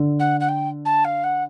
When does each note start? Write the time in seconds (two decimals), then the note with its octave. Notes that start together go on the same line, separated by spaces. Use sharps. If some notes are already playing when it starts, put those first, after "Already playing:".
Already playing: D3
0.19 F#5
0.40 F#5
0.48 G5
0.85 A5
1.04 F5
1.23 F#5